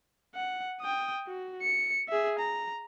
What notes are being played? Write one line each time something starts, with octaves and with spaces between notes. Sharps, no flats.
F#5
G5 D#6
F#4
C#7
G#4 E5
A#5